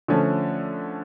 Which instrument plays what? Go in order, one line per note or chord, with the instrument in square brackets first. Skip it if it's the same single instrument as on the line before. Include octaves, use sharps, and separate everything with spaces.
[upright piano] D3 F3 A3 C#4